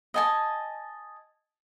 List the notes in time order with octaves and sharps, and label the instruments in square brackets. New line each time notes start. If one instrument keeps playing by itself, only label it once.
[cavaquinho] D#5 G#5 A5